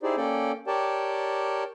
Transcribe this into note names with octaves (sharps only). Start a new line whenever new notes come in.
D#4 E4 G4 G#4 C5 D5
A#3 C#4 A4 D5 G5
G4 A#4 C#5 D5 G5 A5